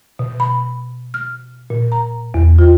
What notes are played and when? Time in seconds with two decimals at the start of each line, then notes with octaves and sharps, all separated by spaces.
0.19 B2
0.40 B5
1.14 F6
1.70 A#2
1.92 A#5
2.34 E2
2.59 F4